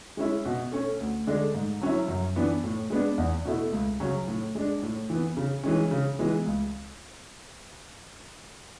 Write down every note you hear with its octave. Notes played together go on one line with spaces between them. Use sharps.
G#3 C#4 E4
B2
A3 C#4
D2
D3 G#3 D4
G#2
F#3 C#4 E4
F#2
E3 B3 D4
A2
G#3 B3 D4
E2
B2 A3 E4
C#2
C#3 F#3 C#4
A2
G#3 D4
A2
E3 B3
C#3
E3 G#3 C#4
C#3
E3 G#3 B3
C#2